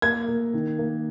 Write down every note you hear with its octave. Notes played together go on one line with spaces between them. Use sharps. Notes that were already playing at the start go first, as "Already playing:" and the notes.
A#3 G#6
A#3
D#3
A#3